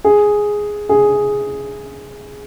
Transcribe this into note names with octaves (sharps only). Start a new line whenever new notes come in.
G#4
G#4